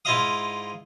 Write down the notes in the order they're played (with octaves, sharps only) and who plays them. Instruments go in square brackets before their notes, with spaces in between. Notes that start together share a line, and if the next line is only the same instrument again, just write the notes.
[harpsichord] G#2 E4 F4 D#5 F5 D#6